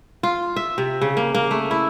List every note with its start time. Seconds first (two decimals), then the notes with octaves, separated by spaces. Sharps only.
0.23 F4
0.56 E5
0.78 C3
1.02 C#3
1.17 A#3
1.34 A#3
1.51 A3
1.71 E4